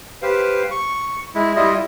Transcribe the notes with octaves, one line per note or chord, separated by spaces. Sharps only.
G4 B4 C5 F5
C#6
G#3 E4
G3 E4 F4 D#5